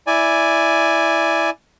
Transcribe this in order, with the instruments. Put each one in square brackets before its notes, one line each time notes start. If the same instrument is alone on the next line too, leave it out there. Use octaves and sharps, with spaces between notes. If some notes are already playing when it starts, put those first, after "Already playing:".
[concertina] E4 D5 G#5